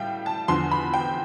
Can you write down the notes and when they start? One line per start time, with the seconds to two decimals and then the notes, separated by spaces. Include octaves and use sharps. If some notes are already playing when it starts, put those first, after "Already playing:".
Already playing: A2 G3 F5 G5
0.26 A5
0.48 E2 D3 F3 C6
0.71 B5
0.94 G5